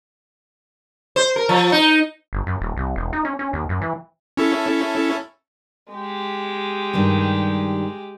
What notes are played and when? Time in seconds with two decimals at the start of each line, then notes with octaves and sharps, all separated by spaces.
1.16 C5
1.36 A#4
1.49 F3
1.72 D#4
2.33 G1
2.47 F#2
2.61 D#1
2.77 C2
2.96 E1
3.13 D#4
3.25 C#4
3.39 C#4
3.53 D#2
3.69 F#2
3.81 E3
4.37 C#4 E4 A4
5.92 G#3 G4
6.93 G2 D#3 G3